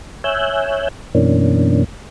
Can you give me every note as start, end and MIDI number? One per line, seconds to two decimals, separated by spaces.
0.24 0.88 73
0.24 0.88 76
0.24 0.88 80
0.24 0.88 88
0.24 0.88 90
0.24 0.88 91
1.15 1.84 42
1.15 1.84 47
1.15 1.84 52
1.15 1.84 58
1.15 1.84 61
1.15 1.84 62